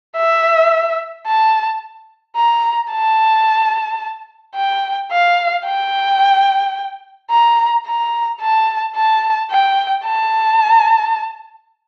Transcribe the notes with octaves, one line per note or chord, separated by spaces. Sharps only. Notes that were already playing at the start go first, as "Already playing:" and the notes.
E5
A5
A#5
A5
G5
F5
G5
A#5
A#5
A5
A5
G5
A5